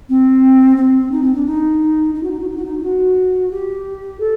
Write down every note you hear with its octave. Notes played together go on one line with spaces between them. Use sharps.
C4
C4
D#4
C4
D4
D#4
D#4
F#4
D#4
F#4
D#4
F#4
D#4
D#4
F#4
G4
A4